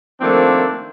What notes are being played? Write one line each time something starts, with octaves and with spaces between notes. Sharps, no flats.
D#3 F3 A3 A#3 C4 D4